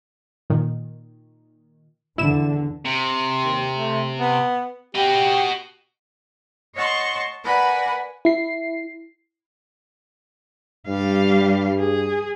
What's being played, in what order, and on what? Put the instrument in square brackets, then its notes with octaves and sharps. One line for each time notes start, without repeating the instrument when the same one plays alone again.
[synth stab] A#2 D#3
[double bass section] E2 D3 [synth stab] E4 E7
[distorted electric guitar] C3
[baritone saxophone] D#2
A3
B3
[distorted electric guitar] F#4 D#5 [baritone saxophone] G4
[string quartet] C#5 D#5 F#5 A5 C6 C#6
A#4 B4 D5 F#5 G#5 B5
[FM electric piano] E4 C7
[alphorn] G2 [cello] G3 F5
[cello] G#4